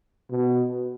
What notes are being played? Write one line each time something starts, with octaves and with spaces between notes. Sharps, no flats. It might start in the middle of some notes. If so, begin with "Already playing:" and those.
B2